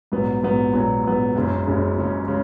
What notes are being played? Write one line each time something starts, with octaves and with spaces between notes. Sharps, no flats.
A#1 G#2 F#3 B3
A#1 G#2 F#3 B3
A#1 G#2 F#3 B3
A#1 G#2 F#3 B3
F#1 F#2 C#3 G#3 C#4
F#1 F#2 C#3 G#3 C#4
F#1 F#2 C#3 G#3 C#4
C#3 G#3 C#4